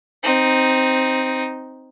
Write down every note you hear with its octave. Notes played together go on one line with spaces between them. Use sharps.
C4 D#4